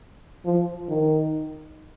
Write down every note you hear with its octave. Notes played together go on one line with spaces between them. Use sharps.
F3
D#3